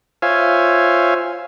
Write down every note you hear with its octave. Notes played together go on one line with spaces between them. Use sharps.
F4 C5 C#5 E5 F5 G#5